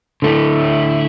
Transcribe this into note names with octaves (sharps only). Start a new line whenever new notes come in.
D3 A3 E4